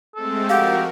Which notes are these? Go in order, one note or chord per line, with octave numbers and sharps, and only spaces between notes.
G#3 A3 C4 A4
F3 F#4 G4 A#4 F5 F#5